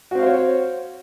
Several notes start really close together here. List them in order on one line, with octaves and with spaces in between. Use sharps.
F#4 C4 F5 C5 C#5